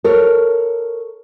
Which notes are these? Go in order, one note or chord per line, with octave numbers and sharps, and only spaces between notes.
A4 A#4 C#5